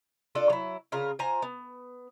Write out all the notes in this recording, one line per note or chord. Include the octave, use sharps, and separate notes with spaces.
D4 F4 A4
F#3 E4
C#3 F4 A#4
F4 C5 G#5 A#5
B3